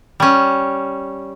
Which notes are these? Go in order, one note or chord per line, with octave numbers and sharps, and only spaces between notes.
G3 C#4